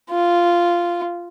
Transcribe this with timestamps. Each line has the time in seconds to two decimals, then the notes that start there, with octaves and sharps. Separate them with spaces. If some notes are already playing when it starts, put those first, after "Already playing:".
0.11 F4